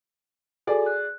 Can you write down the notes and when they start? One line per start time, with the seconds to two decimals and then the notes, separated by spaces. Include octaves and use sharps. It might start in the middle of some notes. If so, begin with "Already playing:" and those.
0.67 F#4 G#4 A4 D5 G#5
0.86 F#6